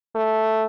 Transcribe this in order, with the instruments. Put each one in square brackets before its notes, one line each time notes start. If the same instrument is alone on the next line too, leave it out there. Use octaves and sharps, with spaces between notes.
[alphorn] A3